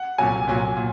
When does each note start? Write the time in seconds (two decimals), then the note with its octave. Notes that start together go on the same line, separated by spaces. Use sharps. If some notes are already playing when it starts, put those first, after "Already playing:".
Already playing: F#5
0.18 C2 A#2 F#3 G#5
0.47 C2 A#2 F#3
0.77 A#2